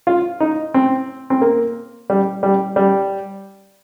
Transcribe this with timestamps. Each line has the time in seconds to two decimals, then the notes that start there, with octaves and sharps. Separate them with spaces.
0.07 F4
0.40 D#4
0.74 C4
1.30 C4
1.41 A#3
2.10 G3
2.43 G3
2.76 G3